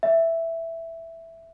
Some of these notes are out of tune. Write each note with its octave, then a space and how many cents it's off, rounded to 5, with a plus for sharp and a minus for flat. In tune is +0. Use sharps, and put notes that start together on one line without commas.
E5 +5